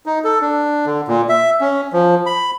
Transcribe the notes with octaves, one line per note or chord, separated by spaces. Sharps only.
D#4
A4
D4
D3
A#2
E5
C#4
F3
B5